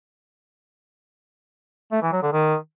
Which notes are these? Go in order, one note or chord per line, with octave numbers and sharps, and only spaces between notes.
A3
E3
F#3
D3
D#3